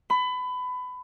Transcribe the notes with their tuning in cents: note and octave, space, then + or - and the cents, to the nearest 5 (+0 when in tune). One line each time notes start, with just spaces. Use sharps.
B5 +25